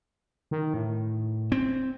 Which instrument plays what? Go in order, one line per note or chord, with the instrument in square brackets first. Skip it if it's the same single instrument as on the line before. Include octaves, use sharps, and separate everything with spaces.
[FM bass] D#3
A2
[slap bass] C4